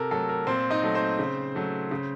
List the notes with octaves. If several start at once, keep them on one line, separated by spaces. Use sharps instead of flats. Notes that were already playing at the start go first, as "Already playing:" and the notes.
Already playing: C3 A4 A#4
F#3 A3 A4
A#4
A#2 C4 C5
D#4 D#5
F#3 A3
C4 C5
C#3
F#3 A3
C#3